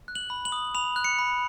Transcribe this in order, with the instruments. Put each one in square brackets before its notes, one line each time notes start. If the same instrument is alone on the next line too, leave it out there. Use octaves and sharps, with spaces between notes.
[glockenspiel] F#6
F#7
B5
F#7
D#6
B5 F7
F#6
C#7
B5